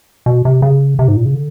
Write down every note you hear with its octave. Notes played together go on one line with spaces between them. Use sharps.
B2
C3
C#3
C3
G#2
A#2
C#3
D3